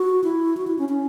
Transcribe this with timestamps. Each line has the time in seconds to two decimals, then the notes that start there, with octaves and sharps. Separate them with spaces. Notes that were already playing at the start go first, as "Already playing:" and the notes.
Already playing: F#4
0.24 E4
0.57 F#4
0.67 E4
0.79 C#4
0.89 C#4